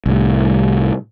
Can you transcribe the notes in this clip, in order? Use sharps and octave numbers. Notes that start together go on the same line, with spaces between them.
C2 A2